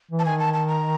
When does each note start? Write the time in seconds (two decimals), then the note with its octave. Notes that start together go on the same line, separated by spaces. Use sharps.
0.11 E3
0.19 A5
0.25 D#3 G#5
0.39 A5
0.54 A5
0.68 A#5